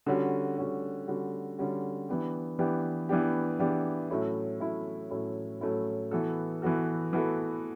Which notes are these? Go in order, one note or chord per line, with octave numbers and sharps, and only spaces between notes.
D3 G3 C#4 F#4
D3 G3 C#4 F#4
D3 G3 C#4 F#4
D3 G3 C#4 F#4
E3 B3 D4 G4
E3 B3 D4 G4
E3 B3 D4 G4
E3 B3 D4 G4
A2 F#3 A3 C#4 E4
A2 F#3 A3 C#4 E4
A2 F#3 A3 C#4 E4
A2 F#3 A3 C#4 E4
E3 B3 F#4 A4
E3 B3 F#4 A4
E3 B3 F#4 A4